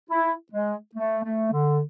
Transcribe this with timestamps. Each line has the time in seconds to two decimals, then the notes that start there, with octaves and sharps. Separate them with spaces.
0.10 E4
0.53 G#3
0.96 A3
1.24 A3
1.52 D3